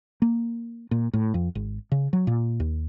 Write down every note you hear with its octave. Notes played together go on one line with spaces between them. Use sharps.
A#3
A#2
A2
F2
G#1
C#3
F#3
A#2
D#2